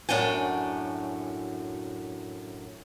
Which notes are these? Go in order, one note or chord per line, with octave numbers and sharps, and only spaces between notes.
F#2 A2 D4 F#4 G5 G#5